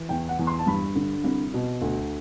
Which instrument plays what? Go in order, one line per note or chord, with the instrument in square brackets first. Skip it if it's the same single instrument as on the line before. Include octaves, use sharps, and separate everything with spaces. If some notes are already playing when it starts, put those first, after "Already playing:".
Already playing: [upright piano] E3
E2 G5
F#5
E2
C6
A5
G2 B5
D3
C2
B2
D2